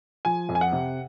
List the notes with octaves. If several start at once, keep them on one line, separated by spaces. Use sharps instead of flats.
F3 G#5
F2
G#5
F#5
C3